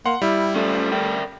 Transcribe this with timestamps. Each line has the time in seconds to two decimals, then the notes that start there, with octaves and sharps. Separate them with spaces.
0.06 A#3 F#5 C6
0.22 G3 E4
0.55 A3 C#4 F4 D5
0.92 A#4 D5 G5